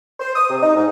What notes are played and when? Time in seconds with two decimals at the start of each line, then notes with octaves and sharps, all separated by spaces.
0.20 C5
0.35 D#6
0.50 C3
0.62 D#4
0.76 G#2